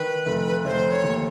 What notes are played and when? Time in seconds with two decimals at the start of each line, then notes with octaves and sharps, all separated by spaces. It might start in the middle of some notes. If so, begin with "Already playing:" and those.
Already playing: D#3 B4
0.26 F1
0.65 F1 C5 C#5
0.91 C#5
1.04 D#2